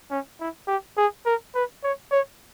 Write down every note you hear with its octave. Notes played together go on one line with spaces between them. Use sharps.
C#4
E4
G4
G#4
A#4
B4
C#5
C#5